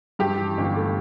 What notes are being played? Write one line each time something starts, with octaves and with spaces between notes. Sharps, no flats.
G2 G4
E3
G1
A3